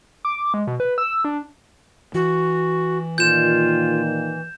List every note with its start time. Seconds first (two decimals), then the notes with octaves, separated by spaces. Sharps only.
0.25 D6
0.54 G#3
0.67 B2
0.80 B4
0.98 E6
1.25 D4
2.14 E3 F#4
3.18 A#2 D#3 F4 G6 E7